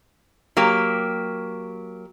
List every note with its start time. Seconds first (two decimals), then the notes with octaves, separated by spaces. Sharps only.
0.57 F#3 A#3 G4